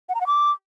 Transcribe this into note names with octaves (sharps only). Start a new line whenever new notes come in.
F#5
A#5
F#5
D6